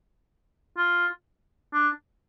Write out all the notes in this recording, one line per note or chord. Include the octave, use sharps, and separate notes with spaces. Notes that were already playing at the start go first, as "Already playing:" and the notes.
F4
D4